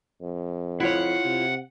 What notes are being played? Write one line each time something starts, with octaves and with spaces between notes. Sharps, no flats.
F2
E4 F4 C#5 F#5
C3